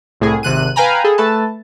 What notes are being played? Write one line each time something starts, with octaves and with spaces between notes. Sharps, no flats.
C2 A2 G#4
G#1 C3 F#6 D#7
B4 F5 G5 G#5 A#5 B5
G#4 A4
A3 A4 B4 A5